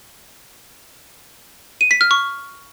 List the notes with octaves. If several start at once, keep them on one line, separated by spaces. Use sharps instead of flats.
D#7
B6
F6
C#6